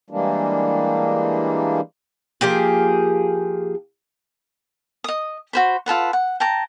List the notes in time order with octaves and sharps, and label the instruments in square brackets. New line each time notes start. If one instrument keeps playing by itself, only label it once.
[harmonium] E3 G3 G#3 A#3 D4
[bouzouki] F3 A#3 G4 G#4
[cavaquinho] D#5 D#6
F#4 C5 B5
F4 A4 B4 F#5
F#5
G5 A5 A#5